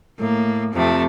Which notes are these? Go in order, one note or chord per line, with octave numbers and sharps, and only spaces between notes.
A2 A#3
F2 C3 A3